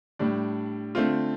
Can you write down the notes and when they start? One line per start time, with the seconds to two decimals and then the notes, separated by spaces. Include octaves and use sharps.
0.19 A2 G3 D4
0.95 D3 A3 C4 F4